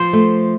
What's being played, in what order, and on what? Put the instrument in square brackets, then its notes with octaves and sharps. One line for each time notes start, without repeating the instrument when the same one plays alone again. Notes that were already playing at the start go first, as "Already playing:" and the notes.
Already playing: [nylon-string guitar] F3 C5
A3